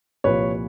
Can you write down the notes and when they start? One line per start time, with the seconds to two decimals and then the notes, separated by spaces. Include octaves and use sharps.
0.24 C2 A#2 F3 B4 C#5